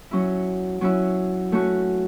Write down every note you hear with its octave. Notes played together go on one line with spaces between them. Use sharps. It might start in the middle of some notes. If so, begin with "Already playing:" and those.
F#3 C#4 E4
F#3 C#4 E4
A3 C#4 F#4